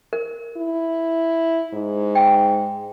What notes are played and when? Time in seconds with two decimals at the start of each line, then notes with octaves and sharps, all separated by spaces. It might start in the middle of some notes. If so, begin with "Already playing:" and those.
0.13 A#4
0.57 E4
1.74 G#2
2.15 G5